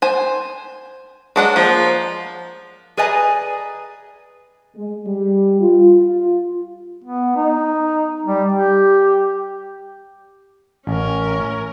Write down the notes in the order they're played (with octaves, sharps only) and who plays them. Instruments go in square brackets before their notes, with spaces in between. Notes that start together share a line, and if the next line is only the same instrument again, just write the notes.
[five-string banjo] C5 G#5
[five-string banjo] F#3 D4 F#5 [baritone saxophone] G#3
[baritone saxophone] F3 [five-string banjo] A#3
[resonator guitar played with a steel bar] G#4 B4 D5 D#5 G#5 A#5
[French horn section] G#3
G3
F4
F4
[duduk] B3
D#4
G3
G4
[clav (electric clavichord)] A1 [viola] C#4 A#4